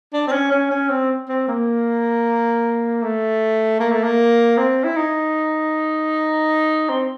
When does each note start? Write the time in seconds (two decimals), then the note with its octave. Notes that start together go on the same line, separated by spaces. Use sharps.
0.13 D4
0.28 C4
0.32 C#4
0.52 C#4
0.71 C#4
0.90 C4
1.29 C4
1.48 A#3
3.03 A3
3.80 A#3
3.92 A3
4.04 A#3
4.57 C4
4.84 E4
4.96 D#4
6.90 C4